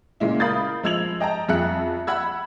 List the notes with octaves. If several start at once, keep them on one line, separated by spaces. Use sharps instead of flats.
A#2 C#3 G#3 E4
A#4 F5 B5 D#6 G6 A6
F3 G#3 E6 G#6 F7 F#7
D#5 G5 A5 A#5
F2 G#4 E5 F#6 C#7
F#5 B5 E6 G#6